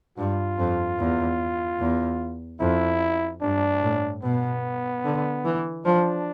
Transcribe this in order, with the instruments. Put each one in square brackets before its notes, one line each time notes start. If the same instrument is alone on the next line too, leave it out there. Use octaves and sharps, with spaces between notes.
[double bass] G2 [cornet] F4
[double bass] F2
E2
E2
[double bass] F2 [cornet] E4
[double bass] G2 [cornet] D4
[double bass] A2
[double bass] B2 [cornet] B3
[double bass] D3
E3
[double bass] F3 [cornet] D4